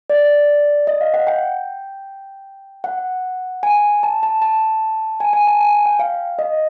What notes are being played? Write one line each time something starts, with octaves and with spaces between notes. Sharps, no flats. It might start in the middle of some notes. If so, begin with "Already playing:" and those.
D5
D#5
F5
F#5
G5
F#5
G#5
A5
A5
A5
G#5
G#5
A5
G#5
G5
F5
D#5